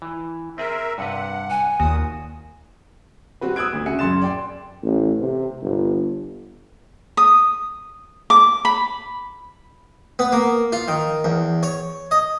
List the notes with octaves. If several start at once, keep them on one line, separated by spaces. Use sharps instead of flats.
E3
C4 G#4 A#4 E5
G2 C3 B4 F#5
G#5
D#2 A#2 D#3 F#4 D#6
G3 C4 F#4 B4
D#6 E6 F#6 G#6 D7
D2
C#3 F#4 E5 G#5 C#7
F#2 C#3 C6 A6 E7
D5 G5 C6
A1
C3
G1
D#6
D6
B5
B3
A#3
F4
D#3
E2
C#5
D#5